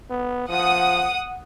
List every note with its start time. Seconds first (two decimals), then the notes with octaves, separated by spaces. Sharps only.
0.10 B3
0.49 F3 F#5 D#6